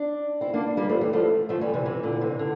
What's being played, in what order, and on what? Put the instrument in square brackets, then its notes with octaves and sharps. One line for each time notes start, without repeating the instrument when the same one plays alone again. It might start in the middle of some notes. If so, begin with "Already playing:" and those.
Already playing: [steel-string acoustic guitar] D4
C4 E4
A#3 D4
G3 A#3
F3 A3
E3 G3
F3 A3
F3 A3
E3 G3
C3 E3
C3 E3
A#2 D3
C3 E3
D3